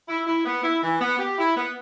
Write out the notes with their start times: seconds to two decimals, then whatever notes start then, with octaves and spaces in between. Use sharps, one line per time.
0.09 E4
0.27 E4
0.45 B3
0.64 E4
0.83 E3
1.01 B3
1.19 G4
1.39 E4
1.57 B3